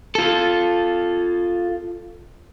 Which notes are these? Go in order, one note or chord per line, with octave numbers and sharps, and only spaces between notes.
F4 A4